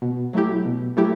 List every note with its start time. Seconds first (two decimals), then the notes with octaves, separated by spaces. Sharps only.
0.02 B2
0.33 F#3 A3 E4 G4
0.65 B2
0.97 F#3 A3 E4 G4